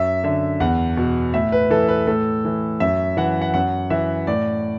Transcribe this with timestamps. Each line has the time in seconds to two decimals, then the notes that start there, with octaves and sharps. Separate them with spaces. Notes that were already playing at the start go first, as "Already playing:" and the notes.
Already playing: F#2 E5
0.24 D3 E5
0.60 E2 F#5
0.97 B2
1.34 A2 E5
1.52 B4
1.70 E3 A4
1.88 B4
2.07 A2 A4
2.45 E3
2.80 F#2 E5
3.17 E3 F#5
3.42 F#5
3.54 F#2 F#5
3.90 E3 E5
4.27 A2 D5